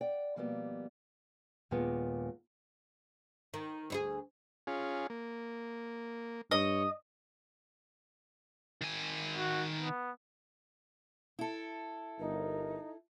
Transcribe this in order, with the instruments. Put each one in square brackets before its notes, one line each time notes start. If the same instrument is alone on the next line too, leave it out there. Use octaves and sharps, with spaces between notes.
[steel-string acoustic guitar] D5 F#5 G5
B2 F3 G3 A#3 B3
[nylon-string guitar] D#2 A#2 G#3 B3
[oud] D#3
D2 D#4 G#4
[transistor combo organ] C#4 F4 G#4
A#3
[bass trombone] G2 [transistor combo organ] C#5 [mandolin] D#5
[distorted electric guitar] D#3 G#5
[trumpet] F#4
B3
[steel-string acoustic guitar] E4 A4
[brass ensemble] G1 A#4 [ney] D#4